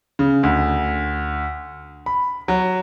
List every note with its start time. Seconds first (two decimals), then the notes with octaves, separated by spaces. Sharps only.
0.19 C#3
0.43 D2
2.06 B5
2.48 F#3